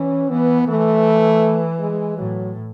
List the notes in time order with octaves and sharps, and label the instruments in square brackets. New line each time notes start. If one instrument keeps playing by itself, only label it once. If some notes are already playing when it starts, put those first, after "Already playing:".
Already playing: [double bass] E3 [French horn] C#4
[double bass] E3 [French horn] B3
[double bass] E3 [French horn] A3
[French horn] G#3
[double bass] A2 [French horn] F#3